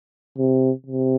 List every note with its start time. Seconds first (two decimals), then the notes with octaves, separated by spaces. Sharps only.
0.38 C3
0.86 C3